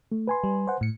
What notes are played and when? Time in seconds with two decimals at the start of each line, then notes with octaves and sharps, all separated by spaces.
0.12 A3
0.28 B4 G#5 C6
0.44 G3
0.67 C5 F#5
0.81 A2 C#7